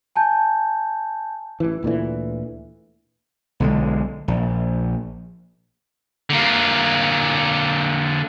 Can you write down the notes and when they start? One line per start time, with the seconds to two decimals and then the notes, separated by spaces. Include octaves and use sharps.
0.16 G#5 A5 G6
1.60 A1 E3
1.83 D2 A#2 D3 E3
3.60 B1 D3 G#3
4.28 A#1
6.30 D3 A#3